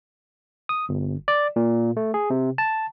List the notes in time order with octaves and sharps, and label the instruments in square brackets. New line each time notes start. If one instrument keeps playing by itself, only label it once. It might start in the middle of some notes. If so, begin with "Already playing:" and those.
[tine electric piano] D#6
G1
D5
A#2
A3
G#4
C3
A5